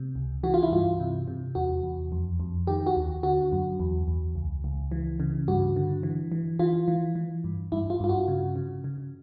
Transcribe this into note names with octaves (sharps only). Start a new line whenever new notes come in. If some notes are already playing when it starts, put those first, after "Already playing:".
Already playing: C3
C#2
E3 F#4
F4
E4
G2 F4
C3
C3
E2 F#4
E2
F2
F2
D#3 G4
F#4
D#2
D3 F#4
F#2
E2
E2
C#2
C#2
E3
C#3
G2 F#4
D3
E3
E3
E3 F4
E3
E3
G2
G2 E4
F4
G2 F4
F#4
C#3
C#3
C#3